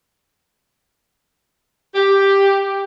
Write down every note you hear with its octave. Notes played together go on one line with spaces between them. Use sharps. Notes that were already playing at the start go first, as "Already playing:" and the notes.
G4